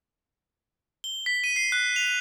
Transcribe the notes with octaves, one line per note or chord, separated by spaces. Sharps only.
G7
B6
D#7
C7
F#6
F7